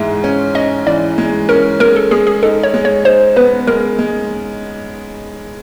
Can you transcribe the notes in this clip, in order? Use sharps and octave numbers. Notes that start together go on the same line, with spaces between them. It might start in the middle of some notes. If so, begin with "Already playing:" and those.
Already playing: G#2 E3 G#3 E5
C#4
C#4 D#5
E3 D5
G#3
C#4 A#4
G#3 A#4
A4
G#3 G#4
G#4
D#4 A4
C#5
G#3
C#5
D#4 C5
B3 B4
G#3 A#4
G#3